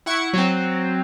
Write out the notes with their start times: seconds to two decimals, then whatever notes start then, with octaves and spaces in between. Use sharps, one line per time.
0.06 E4 F#5 C#6
0.33 F#3 C4